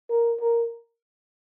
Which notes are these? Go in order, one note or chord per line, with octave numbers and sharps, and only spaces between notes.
A#4
A#4